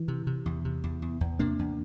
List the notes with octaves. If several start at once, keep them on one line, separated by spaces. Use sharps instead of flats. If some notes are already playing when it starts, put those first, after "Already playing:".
Already playing: E3
C3
C3
E2
C3
E2
E2
E2
C3 A#3 D4
E2